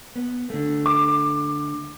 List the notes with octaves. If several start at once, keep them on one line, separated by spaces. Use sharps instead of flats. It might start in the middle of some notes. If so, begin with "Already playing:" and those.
B3
D3 A3
D6